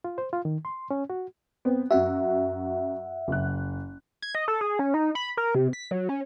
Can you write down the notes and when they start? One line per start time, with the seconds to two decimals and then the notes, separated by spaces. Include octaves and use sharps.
0.04 F4
0.18 C5
0.33 F4
0.45 D#3
0.65 C6
0.91 C#4
1.10 F#4
1.65 B3 C4
1.91 F#2 F#4 E5 F#5
3.28 F#1 F#6
4.22 G#6
4.35 D#5
4.48 A4
4.61 G#4
4.79 C#4
4.94 D#4
5.15 B5
5.37 A#4
5.55 C3
5.73 B6
5.91 F#3
6.09 C#4